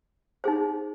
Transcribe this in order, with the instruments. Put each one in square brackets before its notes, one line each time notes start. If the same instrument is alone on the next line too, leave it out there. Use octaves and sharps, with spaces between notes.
[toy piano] D#4 G#4 C5